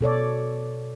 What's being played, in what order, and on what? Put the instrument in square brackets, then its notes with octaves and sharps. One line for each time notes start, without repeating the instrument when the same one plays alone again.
[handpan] B2 A4 C#5 D5